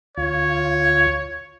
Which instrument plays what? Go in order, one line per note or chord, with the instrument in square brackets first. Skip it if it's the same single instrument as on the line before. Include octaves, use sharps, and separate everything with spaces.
[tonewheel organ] D2 F4 [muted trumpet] C#5